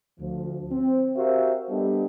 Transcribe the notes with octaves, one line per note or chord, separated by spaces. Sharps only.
D2 F3
C4
F#4 G4 A#4 C5 E5 F5
G3 B3 D4 G4 A4 D#5